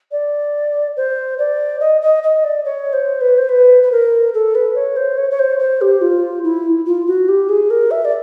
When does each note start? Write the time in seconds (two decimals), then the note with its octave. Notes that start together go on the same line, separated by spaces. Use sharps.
0.11 D5
0.97 C5
1.38 D5
1.80 D#5
2.01 D#5
2.23 D#5
2.44 D5
2.65 C#5
2.93 C5
3.21 B4
3.38 C5
3.49 B4
3.83 B4
3.92 A#4
4.34 A4
4.55 B4
4.75 C#5
4.96 C5
5.18 C#5
5.31 C#5
5.39 C5
5.59 C5
5.81 G4
6.01 F4
6.44 E4
6.86 F4
7.07 F#4
7.28 G4
7.49 G#4
7.70 A#4
7.91 E5
8.05 D5